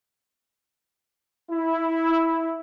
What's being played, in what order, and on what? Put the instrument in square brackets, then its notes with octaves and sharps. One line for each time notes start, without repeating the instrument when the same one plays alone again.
[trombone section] E4